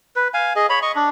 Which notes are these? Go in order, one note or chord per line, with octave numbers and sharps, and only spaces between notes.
B4
F5 G#5
G#4 D#5
C#5 B5
D#5 C#6
D4